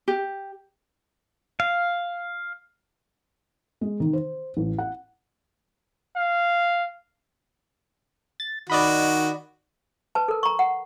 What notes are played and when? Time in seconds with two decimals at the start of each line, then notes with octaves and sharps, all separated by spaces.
0.08 G4
1.60 F5
3.81 G#3
4.00 D#3
4.13 C5
4.57 A1
4.78 F#5
6.16 F5
8.40 A6
8.70 D#3 F#4 D5 D#5 B5
10.15 B4 A5
10.28 A4 A#4
10.43 A#5 C#6
10.59 F#5